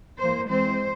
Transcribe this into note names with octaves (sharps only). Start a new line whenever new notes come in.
E3 A#3 C5
E3 G#3 C4 C5